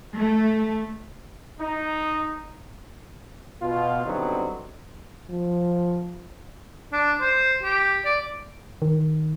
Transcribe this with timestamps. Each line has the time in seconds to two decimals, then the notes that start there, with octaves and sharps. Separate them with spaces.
0.16 A3
1.59 D#4
3.62 B2 F4
4.05 D3 F#3 G3 B3 C4 D#4
5.30 F3
6.93 D4
7.21 C5
7.63 G4
8.05 D5
8.82 D#3